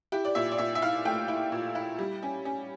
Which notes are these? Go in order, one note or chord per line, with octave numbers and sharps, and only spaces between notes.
E4 G4
D5
A#2 E5
D5
A#2 E5
E5
E4 F5
A3 G5
E4
A#2
E4
G3
C#4
C#4